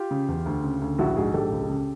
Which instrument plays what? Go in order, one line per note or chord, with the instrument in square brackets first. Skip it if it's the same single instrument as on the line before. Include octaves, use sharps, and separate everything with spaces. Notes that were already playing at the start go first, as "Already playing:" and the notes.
Already playing: [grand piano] F4 G4
C#3
E2
D2
C#3
D2
A#1 E4 F#4
G#2 F#4 G#4
A#1 G4 A4
C#2
C#3